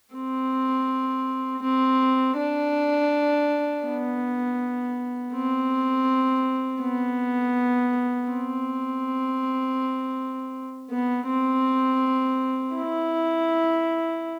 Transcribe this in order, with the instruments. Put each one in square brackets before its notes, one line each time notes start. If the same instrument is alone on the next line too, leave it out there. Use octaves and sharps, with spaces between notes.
[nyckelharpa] C4
C4
D4
B3
C4
B3
C4
B3
C4
E4